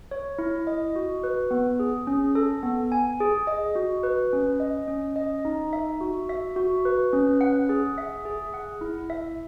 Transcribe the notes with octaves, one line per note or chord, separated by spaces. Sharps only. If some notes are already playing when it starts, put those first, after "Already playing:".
C#5
E4
D#5
F#4
B4
B3
G#4
C#4
A4
B3
G#5
G#4
D#5
F#4
B4
C#4
D#5
C#4
D#5
D#4
E5
F#4
E5
F#4
B4
C#4
F#5
G#4
E5
G#4
F#5
E4
E5